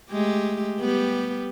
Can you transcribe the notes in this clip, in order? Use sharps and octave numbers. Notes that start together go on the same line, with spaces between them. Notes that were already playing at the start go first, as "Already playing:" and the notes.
G#3 A3 G4
G3 B3 G4